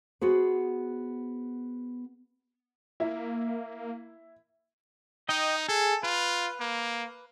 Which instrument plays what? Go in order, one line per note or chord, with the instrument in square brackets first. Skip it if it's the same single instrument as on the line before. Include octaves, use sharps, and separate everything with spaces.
[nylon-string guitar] B3 F#4 G#4 C5
[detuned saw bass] A#3 [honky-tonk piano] E4
[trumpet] D#4 [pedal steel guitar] D#5 G5
[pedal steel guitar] G#4 [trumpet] A4
[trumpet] F4 [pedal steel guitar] B4
[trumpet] A#3